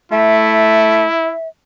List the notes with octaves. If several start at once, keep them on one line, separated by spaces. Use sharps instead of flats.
A3 E4 E5